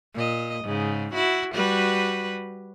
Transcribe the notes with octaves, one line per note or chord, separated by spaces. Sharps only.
A#2 D#5
G#2 C#3
E4 F#4
G3 F#4 B4